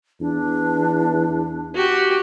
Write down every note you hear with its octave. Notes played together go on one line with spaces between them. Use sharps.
E2 D4
F#4 G4